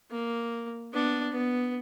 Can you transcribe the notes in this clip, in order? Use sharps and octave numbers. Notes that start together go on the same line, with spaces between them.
A#3
B3 D4
B3